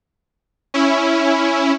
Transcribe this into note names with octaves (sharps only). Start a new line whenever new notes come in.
C#4 E4